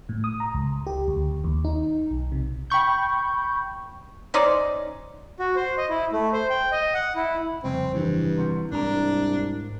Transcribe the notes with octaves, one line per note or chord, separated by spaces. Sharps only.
A2
D#6
A#5
C#2
G4
D2
D#2
D#4
B1
C3
G5 B5 C#6 G6
C#4 D#4 C5 D5
F#4
C5
D#5
E4
A3
C5
G5
D#5
F#5
E4
C2 F2 C#3 C4
G2 E3
C3 G3 F#4
C2 G#2 D4 A#4 A#5